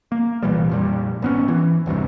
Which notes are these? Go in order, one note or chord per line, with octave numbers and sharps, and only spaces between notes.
A#3
C2 A#2 E3 G3
F2 A#2 G3
G#1 B3 C#4
E3
F1 D2 G2 C3